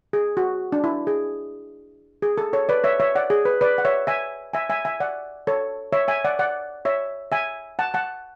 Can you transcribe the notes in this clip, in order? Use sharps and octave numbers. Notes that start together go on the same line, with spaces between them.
G#4
F#4
D4
E4
G#4
G#4
A4
A4 C#5
B4 D5
C#5 E5
C#5 E5
D5 F#5
G#4
B4
B4 D5
F#5
C#5 E5
E5 G#5
E5 G#5
E5 G#5
E5 G#5
D5 F#5
A4 C#5
C#5 E5
E5 G#5
D5 F#5
D5 F#5
C#5 E5
E5 G#5
F#5 A5
F#5 A5